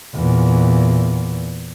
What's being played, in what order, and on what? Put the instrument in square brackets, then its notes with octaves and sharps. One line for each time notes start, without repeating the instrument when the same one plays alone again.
[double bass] E2 A#2